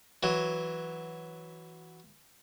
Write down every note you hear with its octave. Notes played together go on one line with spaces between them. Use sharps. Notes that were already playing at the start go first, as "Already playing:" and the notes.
E3 F#3